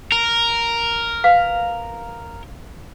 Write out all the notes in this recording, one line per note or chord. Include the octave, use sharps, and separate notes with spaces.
A#4
B4 F5